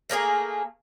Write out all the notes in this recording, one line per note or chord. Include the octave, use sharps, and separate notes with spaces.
A3 A#3 D4 G#4